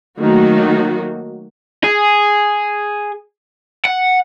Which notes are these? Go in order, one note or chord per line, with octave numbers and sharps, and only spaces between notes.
D#3 F#3 A3 A#3 D#4 F#4
G#4
F#5